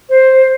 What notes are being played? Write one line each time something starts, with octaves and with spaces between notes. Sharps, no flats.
C5